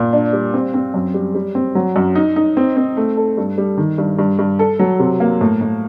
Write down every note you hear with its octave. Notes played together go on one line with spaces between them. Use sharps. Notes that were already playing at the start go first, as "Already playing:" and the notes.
Already playing: A#2
D4
G3
C4
C4
F#2
G3
G3
C4
F#3
F#2
D#4
D#4
C4
C4
A3
A4
G2
G3
D#3
G2
G2
G2
A4
F#3
C3
A#3
A2
A2